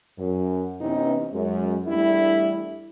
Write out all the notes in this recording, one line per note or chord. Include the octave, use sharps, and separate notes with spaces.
F#2
C3 E3 B3 C#4 D#4 E4
F#2 G#3
E2 G3 A3 D4 E4